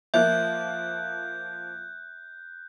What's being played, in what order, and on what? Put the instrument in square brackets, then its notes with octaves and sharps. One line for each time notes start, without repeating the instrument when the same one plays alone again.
[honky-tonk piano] F3 A#3 [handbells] E5 [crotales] F#6 G6